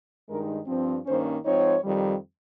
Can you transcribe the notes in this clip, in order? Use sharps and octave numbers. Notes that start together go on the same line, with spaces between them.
G2 D#3 G#3 D#4 A#4
G2 F3 C4
G2 D#3 A#3 C#4 C5
G#2 F3 C4 D#4 C#5
F2 D#3 G3